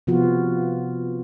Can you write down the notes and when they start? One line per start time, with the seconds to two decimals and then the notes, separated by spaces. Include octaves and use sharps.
0.07 C3 F3 B3 F4 F#4